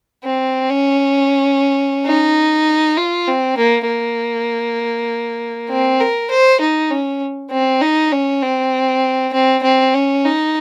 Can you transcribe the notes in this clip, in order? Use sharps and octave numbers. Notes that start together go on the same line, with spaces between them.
C4
C#4
D#4
F4
C4
A#3
A#3
C4
A#4
C5
D#4
C#4
C4
D#4
C#4
C4
C4
C4
C#4
D#4